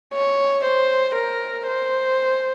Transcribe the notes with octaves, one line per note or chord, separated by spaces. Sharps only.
C#5
C5
A#4
C5